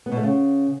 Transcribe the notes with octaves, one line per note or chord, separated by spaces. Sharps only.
B3
B2
A3
C#3